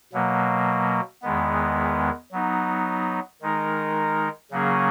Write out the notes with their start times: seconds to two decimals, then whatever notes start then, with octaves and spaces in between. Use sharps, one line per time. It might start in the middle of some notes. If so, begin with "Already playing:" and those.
0.13 B2 F#3 A#3
1.22 E2 D#3 G#3 B3
2.32 F#3 B3 D#4
3.41 D#3 G#3 D#4 A#4
4.51 C#3 F#3 A#3 C#4 G#4